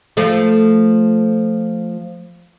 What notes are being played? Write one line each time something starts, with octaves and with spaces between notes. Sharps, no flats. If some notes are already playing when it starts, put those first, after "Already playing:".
F3 A3